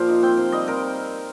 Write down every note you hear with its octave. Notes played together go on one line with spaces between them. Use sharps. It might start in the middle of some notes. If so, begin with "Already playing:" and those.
Already playing: A#2 F3 G4 C5 F5
D#4
C4 G5
C3
G3 D#5
C3 A#4